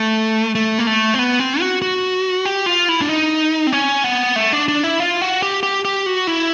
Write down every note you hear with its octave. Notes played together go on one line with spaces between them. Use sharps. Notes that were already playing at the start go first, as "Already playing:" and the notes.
Already playing: A3
A3
A#3
A3
C4
B3
C4
F#4
F#4
G4
F4
E4
D4
D#4
C4
C#4
B3
A3
D4
D4
E4
F4
F#4
G4
G4
G4
F#4
E4